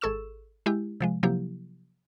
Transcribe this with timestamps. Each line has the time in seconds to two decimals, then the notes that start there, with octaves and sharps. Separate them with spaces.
0.01 G#1 G#4 A4 C#6 E6 E7
0.66 G#3 E4 G4
1.01 C3 F3 G#3
1.23 C3 F3 F#3 A#3 E4 G4